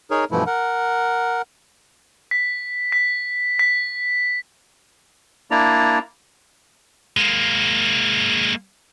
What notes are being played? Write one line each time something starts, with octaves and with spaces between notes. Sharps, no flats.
D#4 G#4 A#4 C#5
G2 B2 E3 F3 A3 E4
A#4 F#5
B6
B6
B6
A#3 D4 E4 D5 A#5
G#3 A#3